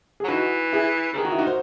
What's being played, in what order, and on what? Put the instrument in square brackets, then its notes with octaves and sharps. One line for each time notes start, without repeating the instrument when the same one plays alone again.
[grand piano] G#4
[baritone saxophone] F#3
[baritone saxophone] E3 [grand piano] D#4 F#4
[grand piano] E4 G#4
[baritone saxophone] C#3
[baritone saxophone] D#3 [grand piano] G#4
[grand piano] F#4
E4
D#4 F#4
C5